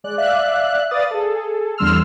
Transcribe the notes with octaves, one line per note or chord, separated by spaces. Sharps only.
G#3 D5 F#6
D5 E5 F5 F#6
B4 D5 F5 D#6 A6
G#4 A4
E2 D3 G3 C6 E6 F6